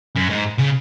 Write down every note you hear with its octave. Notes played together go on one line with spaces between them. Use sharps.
F#2
G#2
C#3